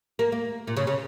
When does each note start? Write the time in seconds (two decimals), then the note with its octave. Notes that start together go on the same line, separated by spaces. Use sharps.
0.19 A#3
0.32 A#3
0.67 A#2
0.77 C#3
0.87 C#3